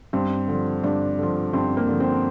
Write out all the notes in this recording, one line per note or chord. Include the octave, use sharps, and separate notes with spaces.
G2 C4
D3 F3
G2 D4
D3 F3
G2 C4
A#3
D3 F3
C4